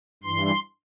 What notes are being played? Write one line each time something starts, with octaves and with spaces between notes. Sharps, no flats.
G2 E3 C6